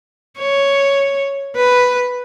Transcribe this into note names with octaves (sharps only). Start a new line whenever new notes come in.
C#5
B4